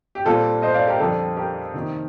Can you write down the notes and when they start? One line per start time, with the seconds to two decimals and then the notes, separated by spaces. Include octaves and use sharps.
0.15 G4
0.25 A#2 G3 C4 F4 A4
0.62 C5 D#5
0.74 D5 F5
0.88 G4 A#4
0.99 F2 D3 G3 D4 A4
1.36 G4 A#4
1.73 C3 D#3 A#3 D#4